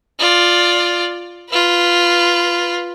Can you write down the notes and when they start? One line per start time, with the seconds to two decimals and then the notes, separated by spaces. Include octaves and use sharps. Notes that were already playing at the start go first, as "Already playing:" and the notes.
0.19 F4 D5
1.49 F4 B4